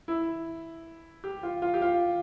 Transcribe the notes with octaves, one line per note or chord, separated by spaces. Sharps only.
E4
G4
F4
F4
G4
F4